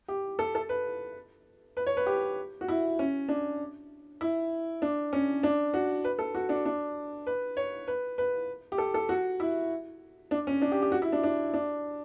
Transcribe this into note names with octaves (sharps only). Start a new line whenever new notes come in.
G4
A4
A4
B4
B4
C#5
B4
G4
F#4
E4
C#4
D4
E4
D4
C#4
D4
F#4
B4
A4
F#4
D4
D4
B4
C#5
B4
B4
G4
A4
A4
F#4
E4
D4
C#4
D4
G4
G4
F#4
E4
D4
D4
D4